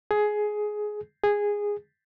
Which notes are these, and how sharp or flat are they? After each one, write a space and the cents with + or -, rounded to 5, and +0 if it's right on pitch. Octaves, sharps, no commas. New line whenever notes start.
G#4 +15
G#4 -10